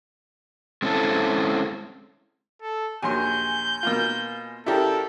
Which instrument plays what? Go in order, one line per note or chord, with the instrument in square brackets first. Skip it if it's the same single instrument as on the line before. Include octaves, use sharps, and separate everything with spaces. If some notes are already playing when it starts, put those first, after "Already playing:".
[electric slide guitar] G#3 C4 C#4 E4 A4
[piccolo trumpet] A4
[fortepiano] A#1 D#2 F#3 [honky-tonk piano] G#5 C6 [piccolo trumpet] G6
[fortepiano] B2 A#3 F4
[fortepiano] C#3 D5 [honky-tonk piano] E4 G4 A#4 [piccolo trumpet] A4